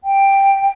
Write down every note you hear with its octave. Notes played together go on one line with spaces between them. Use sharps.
G5